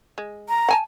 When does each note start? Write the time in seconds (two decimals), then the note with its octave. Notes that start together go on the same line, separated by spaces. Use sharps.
0.18 G#3
0.49 A#5
0.69 F#5 G#5 A5